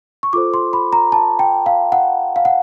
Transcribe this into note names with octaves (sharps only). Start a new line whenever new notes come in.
C#6
F4 A4 C5 D6
C6
B5
A#5
A5
G5
F5
F#5
F5
F#5